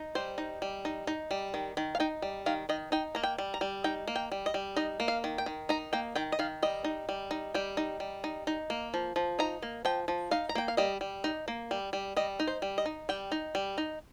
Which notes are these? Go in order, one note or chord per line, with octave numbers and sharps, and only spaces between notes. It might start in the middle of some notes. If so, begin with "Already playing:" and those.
Already playing: D#4
G3 C5
D#4
G3
D#4
D#4
G3
D#3
D#3
F5
D#4 G5
G3
D#3 F5
D#3 D#5
D#4 G5
A#3 A#5
G5
G3
A#5
G3
D#4 G5
A#3
G5
G3
D#5
G3
D#4 D#5
A#3
F5
D#3
G5
D#3
D#4 A#5
A#3 G5
D#3 G5
D#5
D#3 F5
G3 D#5
D#4
G3
D#4
G3 G5
D#4
G3
D#4
D#4
A#3
F3
F3
D#4 A#5
A#3
F3 G5
F3
D#4 F5
A#5
A#3 G5
F5
G3 D#5
G3
D#4
A#3
G3
G3
G3 D#5
D#4
C5
G3
D#5
D#4
G3 G5
D#4
G3
D#4